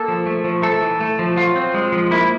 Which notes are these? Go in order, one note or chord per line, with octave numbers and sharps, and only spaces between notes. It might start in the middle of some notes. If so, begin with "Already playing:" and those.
Already playing: A#3 A4
F3
A3
F3
A3 A4
E3
A3
F3
F#3 F4
C4
G#3
F3
A#3 E4